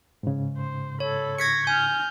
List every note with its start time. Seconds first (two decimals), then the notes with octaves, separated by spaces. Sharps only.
0.23 G#2 C#3
0.58 C5
1.00 A4 C#5 B5
1.38 C#6 G#6 A#6 B6 C#7
1.67 G#5 F6 G6